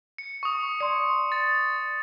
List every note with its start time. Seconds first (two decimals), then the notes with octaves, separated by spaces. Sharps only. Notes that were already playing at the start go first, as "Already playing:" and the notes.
0.18 C#7
0.43 C#6 D#6
0.80 D5 C6 C#7
1.32 A6